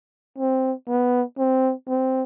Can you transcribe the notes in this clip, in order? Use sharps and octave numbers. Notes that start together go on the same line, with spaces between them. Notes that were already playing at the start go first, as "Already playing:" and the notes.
C4
B3
C4
C4